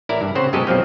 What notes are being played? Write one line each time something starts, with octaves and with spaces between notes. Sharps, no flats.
A1 E4 A#4 D5
G2
C#3 C4 C5 F#5
F#2 B2 G#3 G4 A4 D#5
B1 F#2 F3 C4